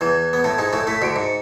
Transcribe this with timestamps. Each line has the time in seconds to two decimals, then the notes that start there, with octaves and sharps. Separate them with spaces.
0.01 E2 E3 G#6
0.33 B3
0.44 A2 A3
0.58 G#2 G#3
0.73 A2 A3
0.87 A2 A3 B6
1.02 D2 D3 D7
1.09 C#7
1.16 G#2